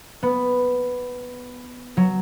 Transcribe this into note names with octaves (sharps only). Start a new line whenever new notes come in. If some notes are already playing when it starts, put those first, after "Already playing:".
B3
F#3